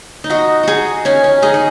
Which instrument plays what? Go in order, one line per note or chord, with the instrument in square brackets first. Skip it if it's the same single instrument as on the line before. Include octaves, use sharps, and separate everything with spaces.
[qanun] D#4
[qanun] F#4 [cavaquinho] D#5
[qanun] D#4 F#4 [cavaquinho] G#4
[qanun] C#4 [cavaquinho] G#5
[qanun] C#4
[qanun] D#4 [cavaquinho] G#4
[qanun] D#4